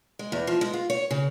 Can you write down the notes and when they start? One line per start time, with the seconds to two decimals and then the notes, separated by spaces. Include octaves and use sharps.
0.19 G#3
0.32 E2
0.47 F3
0.61 G#3
0.73 F4
0.90 C#5
1.11 C#3